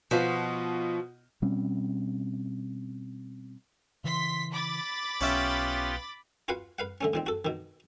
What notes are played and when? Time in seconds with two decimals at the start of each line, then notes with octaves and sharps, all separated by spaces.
0.11 B2 F3 B3 F4
1.42 B2 G3 C4 C#4
4.04 C#3 E3 C6 B6
4.52 B5 D6 A6
5.21 B1 B3 C#4 F4 G4 E5
6.48 F4 F#4 B4 F5 F#5
6.79 B4 F5 F#5
7.01 D3 A3 C#4
7.13 A#2 D#3 C4
7.26 F#4 A4
7.45 B2 D#3